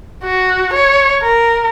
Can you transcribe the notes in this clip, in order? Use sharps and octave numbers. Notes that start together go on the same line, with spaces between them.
F#4
C#5
A#4